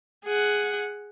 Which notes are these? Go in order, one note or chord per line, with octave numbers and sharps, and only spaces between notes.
G#4 F#5